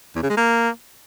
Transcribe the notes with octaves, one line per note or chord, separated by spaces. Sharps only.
E2
C#3
G#3
A#3